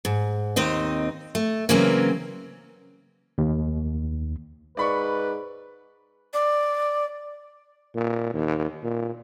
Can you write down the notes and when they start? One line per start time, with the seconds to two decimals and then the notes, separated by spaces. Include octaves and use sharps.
0.05 G#2
0.56 D#2 C4 D#4 D#5
1.35 A3
1.69 C#3 E3 F#3 A#3 C4 C#4
3.38 D#2
4.77 G#2 B4 D5 B5 C#6
6.34 D5
7.95 A#2
8.34 D#2
8.83 A#2